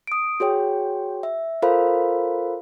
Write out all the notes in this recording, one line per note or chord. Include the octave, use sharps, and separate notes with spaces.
D#6 D7
F#4 G#4 C#5 G5
E5
F4 A4 A#4 C5 F5 B5